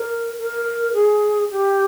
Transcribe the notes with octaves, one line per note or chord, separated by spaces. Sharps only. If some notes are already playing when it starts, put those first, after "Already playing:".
Already playing: A#4
A#4
G#4
G4